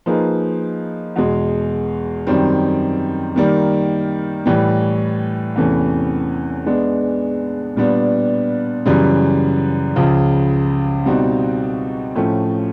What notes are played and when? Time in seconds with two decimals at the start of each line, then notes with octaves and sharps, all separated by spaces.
0.06 F3 A#3 D#4 G#4 B4
1.16 E2 B2 G#3
2.27 F#2 D#3 G3 C4
3.36 D#3 G3 A#3
4.46 A2 E3 G3
5.56 E2 C3 E3 A3 C#4
6.66 G#3 B3 D4
7.76 A#2 G3 B3 D4
8.86 F#2 C#3 E3 G3
9.96 C#2 C#3 F3
11.06 B2 G3 C4 D#4 F#4
12.16 A2 F3 A3 C#4